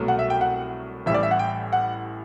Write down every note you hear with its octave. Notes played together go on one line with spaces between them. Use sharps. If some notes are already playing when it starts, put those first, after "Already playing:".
Already playing: C2 B2 F#3 A3
F#5
E5
G5
F#5
A1 A2 G3 E5
D5
E5
F#5
G5
F#5